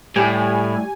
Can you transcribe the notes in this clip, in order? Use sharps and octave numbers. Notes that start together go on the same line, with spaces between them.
A2 G3 G4 G#5